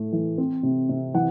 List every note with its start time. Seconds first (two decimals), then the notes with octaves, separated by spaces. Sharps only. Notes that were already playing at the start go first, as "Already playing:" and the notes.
Already playing: A2 A3
0.12 E3
0.38 C4
0.63 C3
0.89 C3
1.14 E3 F#5